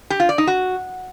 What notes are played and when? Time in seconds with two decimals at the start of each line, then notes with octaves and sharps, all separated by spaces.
0.10 G4
0.20 F4
0.29 D5
0.38 D#4
0.47 F#4